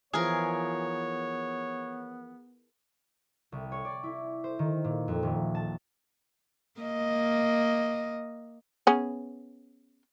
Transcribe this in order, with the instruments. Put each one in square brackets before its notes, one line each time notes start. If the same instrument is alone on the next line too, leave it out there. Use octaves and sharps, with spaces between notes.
[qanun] E3 F3 [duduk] B3 [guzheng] G#4 A#4 [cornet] C#5
[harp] C2
C#5
D5
E4
C5
D#3
A#2
F2
D#1
A5
[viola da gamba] A#3 D#5
[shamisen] B3 C#4 G#4